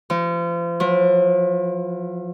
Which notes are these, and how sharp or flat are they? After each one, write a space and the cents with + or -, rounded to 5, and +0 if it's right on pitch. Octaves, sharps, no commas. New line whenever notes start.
F3 -35
F3 +45